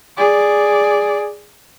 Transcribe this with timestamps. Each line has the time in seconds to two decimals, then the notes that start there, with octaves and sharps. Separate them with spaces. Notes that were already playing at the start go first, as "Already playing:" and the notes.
0.17 G#4 D5